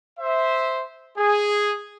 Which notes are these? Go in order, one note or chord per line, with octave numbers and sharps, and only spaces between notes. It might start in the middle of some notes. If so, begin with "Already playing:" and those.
C5 E5
G#4